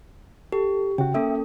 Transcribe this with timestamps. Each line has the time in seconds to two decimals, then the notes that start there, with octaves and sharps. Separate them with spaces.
0.52 G4 A4
0.98 C#3 F#4 G5
1.14 A#3 C#4 A4 E5